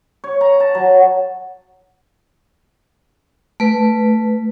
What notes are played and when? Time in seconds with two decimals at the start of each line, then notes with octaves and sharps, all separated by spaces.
0.24 C#5
0.41 A#5
0.60 A5
0.75 F#3
3.60 A3 B4